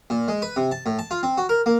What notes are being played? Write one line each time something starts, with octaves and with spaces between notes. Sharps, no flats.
A#2
G#3
B4
C3
A5
A2
A5
F4
C4
F#4
A#4
A#3